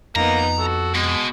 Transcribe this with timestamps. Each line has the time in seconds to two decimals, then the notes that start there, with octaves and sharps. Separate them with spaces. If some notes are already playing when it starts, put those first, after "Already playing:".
0.16 F2 A#3 B3 D#4 A#5
0.59 F#4 A4
0.95 B2 G#3